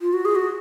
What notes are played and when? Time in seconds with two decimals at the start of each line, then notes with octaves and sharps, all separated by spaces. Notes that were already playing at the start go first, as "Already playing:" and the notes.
0.01 F4
0.13 F#4
0.25 G#4
0.35 F#4